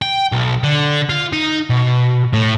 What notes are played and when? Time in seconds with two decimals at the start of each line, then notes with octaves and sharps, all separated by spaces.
0.02 G5
0.32 B1
0.63 D3
1.09 F4
1.33 D#4
1.70 B2
2.33 A2